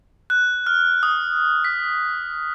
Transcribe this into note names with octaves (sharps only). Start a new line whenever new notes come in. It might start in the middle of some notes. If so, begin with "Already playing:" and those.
F#6
F6
D#6
B6